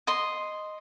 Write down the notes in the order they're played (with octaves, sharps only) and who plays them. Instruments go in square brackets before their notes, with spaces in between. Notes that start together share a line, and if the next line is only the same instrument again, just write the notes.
[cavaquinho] D#5 C6